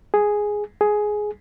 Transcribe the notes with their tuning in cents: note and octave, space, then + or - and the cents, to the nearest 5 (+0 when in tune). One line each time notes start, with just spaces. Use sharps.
G#4 +0
G#4 +10